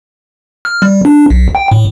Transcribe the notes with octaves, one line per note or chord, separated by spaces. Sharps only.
F6
G3
D4
B1
G5
A2